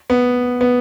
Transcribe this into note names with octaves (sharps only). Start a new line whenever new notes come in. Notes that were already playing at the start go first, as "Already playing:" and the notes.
B3
B3